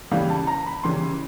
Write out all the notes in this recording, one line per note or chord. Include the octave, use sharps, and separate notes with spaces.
C#3 E3 G3 F5
A5
A#5
B5
C#3 E3 G3 C6